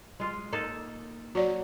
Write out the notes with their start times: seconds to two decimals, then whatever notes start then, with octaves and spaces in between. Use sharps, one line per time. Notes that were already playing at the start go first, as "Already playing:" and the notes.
0.20 G#3 F4
0.52 A#3 D#4 A4
1.35 F#3 F#4 D5